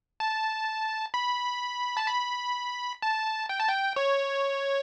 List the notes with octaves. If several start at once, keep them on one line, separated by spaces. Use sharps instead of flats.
A5
B5
A5
B5
A5
G5
A5
G5
C#5